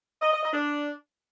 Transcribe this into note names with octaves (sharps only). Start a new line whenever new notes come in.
D#5
D#5
D#5
D4